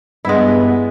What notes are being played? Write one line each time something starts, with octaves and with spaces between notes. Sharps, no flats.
G2 G#3 B3 E4